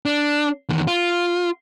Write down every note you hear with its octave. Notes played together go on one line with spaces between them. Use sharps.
D4
E2 D#3
F4